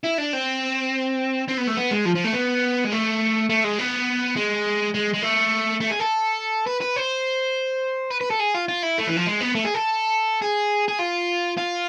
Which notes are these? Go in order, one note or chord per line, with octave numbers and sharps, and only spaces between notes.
E4
D4
C4
C4
B3
A3
B3
G#3
F3
F3
A3
B3
G#3
A3
A3
G#3
B3
G#3
G#3
G#3
A3
A3
G#4
A4
B4
B4
C5
B4
B4
A4
G#4
F4
F4
E4
A3
E3
F3
G#3
B3
A3
G#4
A4
G#4
G#4
F4
F4